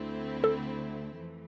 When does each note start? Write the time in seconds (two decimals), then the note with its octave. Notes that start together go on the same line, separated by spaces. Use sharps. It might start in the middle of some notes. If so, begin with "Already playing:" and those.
Already playing: D2 D3 A3 C4 E4
0.44 A4
1.14 F2 E3 A3